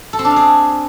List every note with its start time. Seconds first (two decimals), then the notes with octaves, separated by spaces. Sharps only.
0.13 A4
0.19 C4
0.25 D4
0.30 F5
0.36 G#4